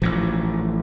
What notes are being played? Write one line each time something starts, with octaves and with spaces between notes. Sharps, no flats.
A1 A2 F3